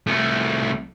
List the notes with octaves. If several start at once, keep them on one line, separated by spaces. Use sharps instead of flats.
C2 A3